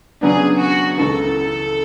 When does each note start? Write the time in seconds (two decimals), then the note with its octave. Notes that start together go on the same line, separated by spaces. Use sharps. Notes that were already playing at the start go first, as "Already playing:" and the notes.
0.21 C#3 F#3 B3 D4 G#4
0.59 F#4
0.98 C#2 C#3 E3 A4